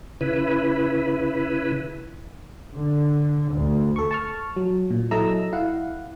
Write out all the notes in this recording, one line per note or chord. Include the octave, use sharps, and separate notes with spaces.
C#3 E4 B4
D3
D2
A4 C#6
A5 C#6 F6
F#3
A#2
F#3 E4 A4 D#5 A#5 E6
E4 F5 F#5